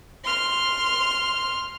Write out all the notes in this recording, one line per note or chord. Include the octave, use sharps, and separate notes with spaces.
C6 F6